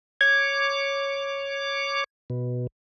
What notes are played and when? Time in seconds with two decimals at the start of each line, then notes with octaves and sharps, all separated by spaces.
0.21 C#5 D6 G#6
2.30 B2